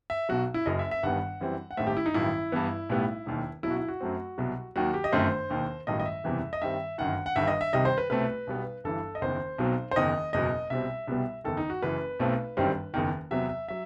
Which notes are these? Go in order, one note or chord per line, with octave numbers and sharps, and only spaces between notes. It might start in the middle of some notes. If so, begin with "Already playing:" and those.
E5
B1 B2 F#3 F#4
E4
F#1 F#2 F#3 D#5
E5
E5
G1 G2 D#3 G3 B3 F#5
F#2 E3 G3 C4
F#5
A1 G2 D#3 A3 C4 E5
G4
E4
D#4
A1 G2 D#3 F#3 E4
G2 E3 B3
B1 A2 G3 B3
E1 D#2 D#3
B1 B2 F#3 E4
F#4
E4
F#4
F#2 F#3 A3 C4
C2 B2 F#3
D#2 D#3 F#3 F#4
G4
D#5
G1 F#2 D#3 A3 C4 C5
E1 D#2 D#3
A1 G2 D#3 F#3 A3 D#5
D#5
E5
F#1 E2 C3 E3 G3
D#5
G2 D#3 G3 C4 E5
G1 F#2 D#3 F#5
F#5
G1 G2 D#3 E5
D#5
E5
C2 C3 D#3 G3 D#5
C5
B4
C2 B2 A3 C4 B4
B1 B2 G3 B3
G1 G2 E3 A4
D#5
F#1 E2 D#3 C5
B1 B2 F#3 C4
C5
F#1 E2 D#3 D#5
F#1 E2 B2 F#3 D#5
C2 B2 G3 C4 E5
C2 B2 G3 B3
F#1 E2 D#3 A4
D#4
F#4
F#1 F#2 E3 B4
B1 B2 A3 C4
G1 F#2 D#3 G3 C4
F#1 E2 D#3
E2 C3 F#3 B3 E5
E5
F#3 E5